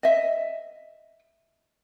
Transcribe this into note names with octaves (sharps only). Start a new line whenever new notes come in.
D#5 E5